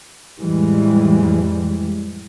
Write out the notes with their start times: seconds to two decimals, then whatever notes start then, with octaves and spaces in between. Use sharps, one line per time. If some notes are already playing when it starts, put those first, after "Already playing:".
0.40 F2 A2 E3 G3 G#3